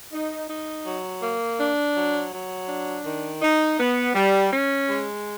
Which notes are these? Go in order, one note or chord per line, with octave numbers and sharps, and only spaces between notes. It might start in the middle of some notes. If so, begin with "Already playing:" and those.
D#4
D#4
F#3
A#3
D4
F#3
F#3
D4
D#3
D#4
B3
G3
C#4
G#3